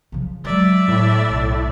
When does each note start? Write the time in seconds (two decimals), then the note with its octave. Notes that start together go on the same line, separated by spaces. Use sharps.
0.12 C#3 F3
0.45 F#3 G#3 D5 E5
0.88 A2
1.29 B1